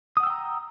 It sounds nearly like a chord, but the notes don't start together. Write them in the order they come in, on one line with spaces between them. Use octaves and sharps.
D#6 F#5 E6 G5 A#5